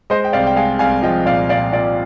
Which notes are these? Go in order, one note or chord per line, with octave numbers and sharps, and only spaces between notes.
G#3 C5 D#5
G5
C2 D5 F5
G5
G#3 F5 G#5
C2 F5 G#5
F3 D#5 G5
A#2 D5 F5
A#2 D5 F5
A#2 D5 F5